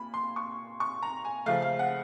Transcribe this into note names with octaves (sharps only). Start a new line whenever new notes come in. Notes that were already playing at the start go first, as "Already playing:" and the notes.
Already playing: A#2 B5
C6
C#6
C#6
A#5
G#5
C#3 F3 A3 F5
F5
F#5